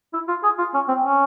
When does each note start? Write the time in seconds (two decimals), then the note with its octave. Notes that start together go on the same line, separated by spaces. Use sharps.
0.13 E4
0.28 F4
0.43 G#4
0.58 F4
0.74 C#4
0.88 C4
1.05 C#4